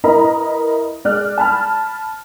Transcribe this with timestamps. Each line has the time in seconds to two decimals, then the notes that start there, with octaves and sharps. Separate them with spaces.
0.04 E4 A#4 B4 D#5 A#5 B5
1.05 G#3 D5 F6 F#6
1.38 A5 B5 F6